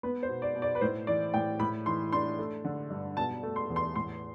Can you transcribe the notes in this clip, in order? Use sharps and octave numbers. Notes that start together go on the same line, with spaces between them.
B3 B4
C5
B2
D5
B2
D5
B4
A2 C5
E3 D5
A2 G5
A2 B5
E3 C6
D4 C6
A3
D3
G2
B2 A5
A3
C6
E2
C6
A2 C6